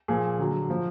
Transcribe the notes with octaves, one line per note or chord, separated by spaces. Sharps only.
A#2 F3 G#4
D3 F#3
A#2 F3